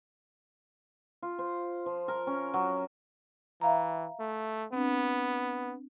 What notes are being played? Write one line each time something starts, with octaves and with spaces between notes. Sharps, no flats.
F4
C5
F3
A#4
C#4
F#3
E3 E5 F5 A#5
A3
B3 C4 D4